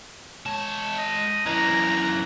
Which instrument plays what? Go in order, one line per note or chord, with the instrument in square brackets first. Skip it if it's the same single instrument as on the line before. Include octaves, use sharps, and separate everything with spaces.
[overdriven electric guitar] G#3 A5 [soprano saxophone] C#5
[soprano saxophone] D#5
[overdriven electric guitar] F#2 E3 [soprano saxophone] A#5